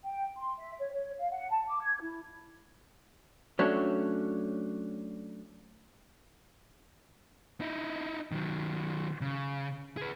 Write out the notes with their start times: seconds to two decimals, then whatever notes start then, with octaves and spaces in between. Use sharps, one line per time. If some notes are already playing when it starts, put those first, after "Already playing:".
0.04 G5
0.37 C6
0.58 E5
0.80 C#5
0.94 C#5
1.18 F5
1.32 F#5
1.50 A5
1.67 D6
1.82 G#6
2.01 E4
3.59 F#3 A3 C#4 D4
7.61 D#4 E4
8.32 D#3 F#3
9.21 C#3
9.97 G#4 B4